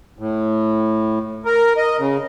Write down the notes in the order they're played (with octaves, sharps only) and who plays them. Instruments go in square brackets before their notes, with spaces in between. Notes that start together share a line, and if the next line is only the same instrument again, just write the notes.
[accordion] A2
A#4
D#5
C#3